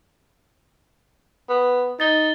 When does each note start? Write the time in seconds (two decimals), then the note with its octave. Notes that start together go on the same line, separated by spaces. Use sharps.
1.49 B3
2.00 D#4 A6 G7